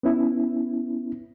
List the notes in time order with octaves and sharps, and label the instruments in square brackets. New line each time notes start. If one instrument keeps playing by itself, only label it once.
[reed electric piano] B3 C#4 E4